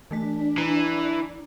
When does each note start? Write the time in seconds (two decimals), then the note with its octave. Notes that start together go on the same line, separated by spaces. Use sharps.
0.11 E3 A3 D4 B6
0.58 E3 A#5